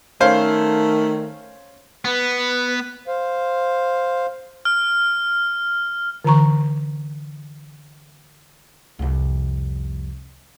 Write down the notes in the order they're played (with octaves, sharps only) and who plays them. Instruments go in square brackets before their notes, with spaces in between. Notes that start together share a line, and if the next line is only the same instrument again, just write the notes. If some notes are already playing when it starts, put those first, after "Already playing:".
[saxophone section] D#3 A3 [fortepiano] C#4 C5 F5
[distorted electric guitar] B3 [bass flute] B4
[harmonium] C5 F5
[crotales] F6
[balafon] D3 E3 A#5 C#6
[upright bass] C2 F2